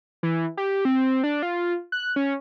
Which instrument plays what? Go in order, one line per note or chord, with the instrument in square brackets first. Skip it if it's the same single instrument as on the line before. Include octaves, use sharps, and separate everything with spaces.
[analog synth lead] E3
G4
C4
D4
F4
F#6
C#4